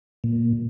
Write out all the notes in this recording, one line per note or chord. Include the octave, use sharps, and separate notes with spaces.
A#2